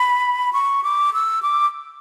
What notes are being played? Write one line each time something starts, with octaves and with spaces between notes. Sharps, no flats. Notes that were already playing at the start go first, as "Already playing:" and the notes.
Already playing: B5
C#6
D6
E6
D6